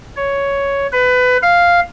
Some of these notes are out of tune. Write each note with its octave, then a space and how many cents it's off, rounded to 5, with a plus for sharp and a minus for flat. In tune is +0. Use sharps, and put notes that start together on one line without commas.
C#5 +5
B4 +20
F5 +0